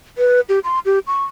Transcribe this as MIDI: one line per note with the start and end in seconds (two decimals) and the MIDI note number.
0.18 0.41 71
0.49 0.59 67
0.64 0.79 84
0.85 0.99 67
1.07 1.24 85